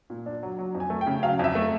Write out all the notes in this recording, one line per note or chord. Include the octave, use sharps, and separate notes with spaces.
A#2
D4
F#3
F#3
F2
G#5
A3
G5
C#3
F#3 F5
F2 E5
A3